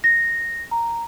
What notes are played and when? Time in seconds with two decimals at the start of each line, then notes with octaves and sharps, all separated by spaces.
0.04 A#6
0.71 A#5